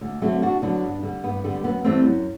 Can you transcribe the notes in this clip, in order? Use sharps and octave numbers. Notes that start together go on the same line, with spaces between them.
D2
D3 F#3 A3 C4
D2 D4 F#4
D3 F#3 B3 D4
G2
D3 G3
G2 B3
D3 G3 B3
F#2 B3
E3 G3 A3 C4
F#2